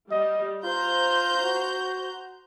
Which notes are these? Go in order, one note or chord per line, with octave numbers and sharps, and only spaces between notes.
G3 D#5
F4 C5 A#5 G6
F#4